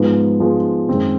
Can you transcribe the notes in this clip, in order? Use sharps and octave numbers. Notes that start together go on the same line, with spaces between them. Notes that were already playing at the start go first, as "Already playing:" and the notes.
Already playing: G#2 F3 G#3 B3
G#2 F3 G#3 B3
F#2 D#3 G#3 C4 D#4